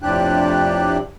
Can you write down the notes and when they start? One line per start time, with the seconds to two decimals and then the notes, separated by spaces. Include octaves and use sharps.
0.02 F2 A2 C3 D4 G4 F#6